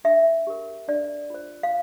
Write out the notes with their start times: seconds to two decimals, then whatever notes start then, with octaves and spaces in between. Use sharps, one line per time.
0.04 D4 E5
0.47 G4 A#4
0.88 D4 D5
1.30 F4 C5
1.63 F5